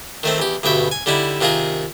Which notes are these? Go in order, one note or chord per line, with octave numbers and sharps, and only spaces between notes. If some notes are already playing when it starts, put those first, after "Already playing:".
D#3 A3 C4
E2 G4
D2 G2 B2 E5 G5
G#5
D3 G3 D#4 E4
C3 D#3 F4 G#4 A#4